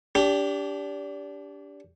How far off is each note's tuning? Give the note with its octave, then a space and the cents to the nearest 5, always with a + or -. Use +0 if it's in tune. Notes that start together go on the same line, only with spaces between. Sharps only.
D4 -30 G4 +5